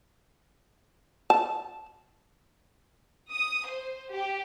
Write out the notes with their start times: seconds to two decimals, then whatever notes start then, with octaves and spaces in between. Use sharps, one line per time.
1.30 A5
3.33 D#6
3.69 C5
4.12 G4